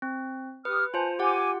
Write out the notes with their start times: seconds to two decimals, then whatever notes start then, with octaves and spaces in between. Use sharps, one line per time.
0.02 C4
0.65 G4 B4 D#6 F6
0.94 F4 C5 G#5 A5
1.19 F4 G4 F#5 G#5 D6